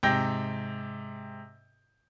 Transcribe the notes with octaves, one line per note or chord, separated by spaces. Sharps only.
G#2 C3 G5 G6 A#6